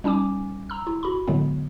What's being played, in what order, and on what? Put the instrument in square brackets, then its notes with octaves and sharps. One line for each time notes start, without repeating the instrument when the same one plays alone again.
[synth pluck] G3 C#4 D#4 G#5 D6
A#5 E6
E4
F#4 B5
A2 D3 F#3 G#3 B3